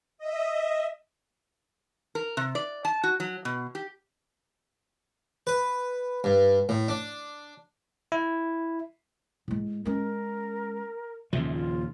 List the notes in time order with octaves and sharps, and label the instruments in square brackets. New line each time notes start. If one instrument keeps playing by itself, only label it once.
[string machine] D#5 E5
[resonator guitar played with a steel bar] A#4
C3
D5
A5
F#4
F#3
B2
G4
[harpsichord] B4
G2
A2
D4
[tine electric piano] E4
[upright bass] A2 G#3
[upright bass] G#3 C#4 [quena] A#4
[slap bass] D#2 A#2 F3 [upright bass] C#3 [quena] E5
[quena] F4